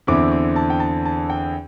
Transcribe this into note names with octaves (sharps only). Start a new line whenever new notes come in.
E2 D3 C4 E4 D6
D6
A5
G5
A5
A5
G5